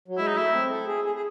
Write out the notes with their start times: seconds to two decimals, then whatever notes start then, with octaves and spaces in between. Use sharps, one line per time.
0.08 F#3
0.18 G#3 E4
0.28 D#4
0.35 A3 E4
0.53 C4
0.70 A4
0.87 G#4
1.04 G#4
1.15 G#4